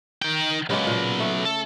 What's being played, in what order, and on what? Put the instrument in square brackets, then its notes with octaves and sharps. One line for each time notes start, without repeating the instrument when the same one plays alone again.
[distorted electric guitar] D#3 G5
[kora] C#3 G#3 A#3 [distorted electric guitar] F#3 B3
[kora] A#2
A3
[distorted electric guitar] A4